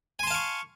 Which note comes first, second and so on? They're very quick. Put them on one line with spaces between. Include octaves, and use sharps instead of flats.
G#5 C6 A5 F5 C#6